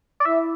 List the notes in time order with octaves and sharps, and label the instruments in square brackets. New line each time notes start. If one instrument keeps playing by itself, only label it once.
[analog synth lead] D5
[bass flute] E4 [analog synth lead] E5